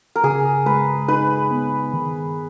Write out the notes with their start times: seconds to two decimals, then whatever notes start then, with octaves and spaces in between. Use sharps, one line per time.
0.16 A#4
0.24 C#3 G#4
0.66 G#3 B4
1.08 D#4 B4
1.51 B3
1.93 D#3